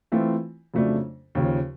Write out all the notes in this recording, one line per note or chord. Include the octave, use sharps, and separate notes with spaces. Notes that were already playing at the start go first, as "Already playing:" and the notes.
E3 A3 C4 F4
F2 C#3 F#3 A3 D4
D#2 C#3 F3